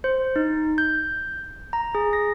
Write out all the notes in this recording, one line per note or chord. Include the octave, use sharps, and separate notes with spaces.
C5
D#4
G6
A#5
G#4
A#6